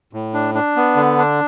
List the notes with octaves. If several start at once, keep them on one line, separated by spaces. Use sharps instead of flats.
A2
D4
D4
B3
D3
D4